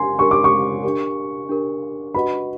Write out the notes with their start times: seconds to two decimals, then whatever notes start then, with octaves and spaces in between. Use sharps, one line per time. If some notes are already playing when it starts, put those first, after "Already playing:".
Already playing: D4 G4 A#4 G#5 C6
0.18 D4 G4 A#4 C#6
0.31 D6
0.44 C#6
0.84 D4 G4 A#4
1.49 D4 G4 A#4
2.14 D4 F#4 B4 D#5 F#5 B5